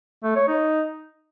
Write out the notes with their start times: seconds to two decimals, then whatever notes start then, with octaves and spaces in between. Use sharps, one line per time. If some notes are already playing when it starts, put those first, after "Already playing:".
0.23 A3
0.35 C#5
0.47 D#4